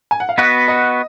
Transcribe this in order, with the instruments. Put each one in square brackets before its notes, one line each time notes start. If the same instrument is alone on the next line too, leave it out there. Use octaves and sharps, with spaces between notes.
[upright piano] G#5
F#5
F5
[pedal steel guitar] B3 F#4 B4 [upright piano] D#5
[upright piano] D#5